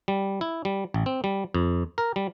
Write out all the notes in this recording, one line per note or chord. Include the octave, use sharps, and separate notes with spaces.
G3
E4
G3
A1
C4
G3
F2
A#4
G3